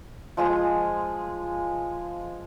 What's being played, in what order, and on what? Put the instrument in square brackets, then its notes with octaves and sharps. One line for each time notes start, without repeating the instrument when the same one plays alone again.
[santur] F3 G#3 G#4 D#6